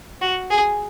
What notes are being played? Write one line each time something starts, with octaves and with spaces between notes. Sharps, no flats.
F#4
G#4